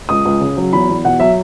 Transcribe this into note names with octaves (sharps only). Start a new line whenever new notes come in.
C#2 D#6
C#2
C#3
F#3
E2 B5
E2
B2 F#5
F#3 E5